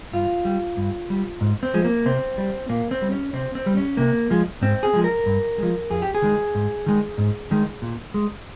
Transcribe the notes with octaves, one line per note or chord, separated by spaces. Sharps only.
G2 F4
G3
G2
G3
G#2
C4
F3 G#3
A#3
C3 C4
G3
A#2 A#3
C4
G3
C#4
C3 C4
C4
G3
C#4
C3 A#3
F3 G#3
G#2 C4
G#4
F3 G#3
A#4
G2
F3 G#3
F2 G#4
G4
G#4
D#3 G#3
G#2
D#3 G#3
G#2
D#3 G#3
A#2
G#3